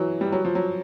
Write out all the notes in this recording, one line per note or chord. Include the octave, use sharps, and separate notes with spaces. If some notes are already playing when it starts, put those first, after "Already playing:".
Already playing: E3 F#3
G3
F#3
F3
F#3